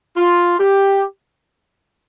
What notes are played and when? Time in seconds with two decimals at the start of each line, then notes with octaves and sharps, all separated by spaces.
0.17 F4
0.60 G4